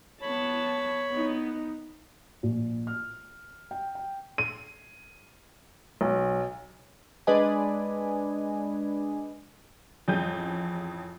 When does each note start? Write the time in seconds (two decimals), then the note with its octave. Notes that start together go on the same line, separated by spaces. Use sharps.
0.22 B3 C#5 A5 B5
1.12 B3 D#4
2.43 A#1
2.87 F6
3.71 G5
3.95 G5
4.38 D#7
6.01 B1
7.27 G#3 D4 B4 D5 D#5 G#5
10.08 A1 F2 G#4 G6 D#7